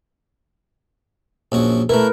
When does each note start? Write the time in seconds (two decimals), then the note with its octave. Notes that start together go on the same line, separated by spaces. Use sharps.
1.52 A#1 F#2 F#4
1.89 A3 E4 A#4 B4